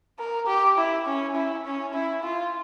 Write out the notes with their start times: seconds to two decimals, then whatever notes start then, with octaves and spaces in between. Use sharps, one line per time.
0.19 A#4
0.47 G4
0.78 E4
1.06 C#4
1.35 E4
1.65 C#4
1.94 E4
2.23 F4